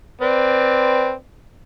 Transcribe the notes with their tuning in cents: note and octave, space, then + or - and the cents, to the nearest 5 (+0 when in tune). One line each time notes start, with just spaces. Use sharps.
C4 +0 B4 +0 D5 +15